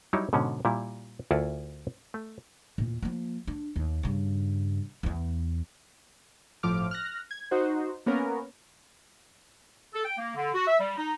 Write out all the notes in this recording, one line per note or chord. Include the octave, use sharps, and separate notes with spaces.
F#3 G3 D#4 E4 C#5
G#2 B2 D3 C#4
A#2 G3 E4
D2 E4 F4 A#4 F#5 A5
A3
E2 A#2
F3 A#3
D4
D#2
G2 C#3
E2 B3
G1 A2 F3 D6 F6
F6 F#6 A#6
G#6
D#4 F#4 C5
A#3 B3 C#4 A#4
A4
G5
A#3
D3
F#4
E5
G3
D#4